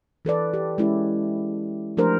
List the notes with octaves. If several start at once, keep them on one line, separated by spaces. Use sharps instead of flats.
E3 A4 B4 D5
G4
G#3 C#4 E4 G4
F3 A3 D4 G4 A#4 C5